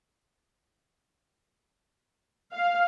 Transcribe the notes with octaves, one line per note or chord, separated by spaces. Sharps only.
F5